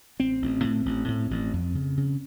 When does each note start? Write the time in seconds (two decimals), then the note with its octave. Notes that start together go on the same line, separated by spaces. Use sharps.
0.19 A1 C4
0.42 A1
0.64 A2
0.86 A1
1.08 A2
1.31 A1
1.53 F2
1.75 C#3
1.97 C#3